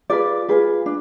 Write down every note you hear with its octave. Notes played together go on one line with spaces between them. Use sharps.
F4 G#4 B4 D5
F4 G#4 B4
D4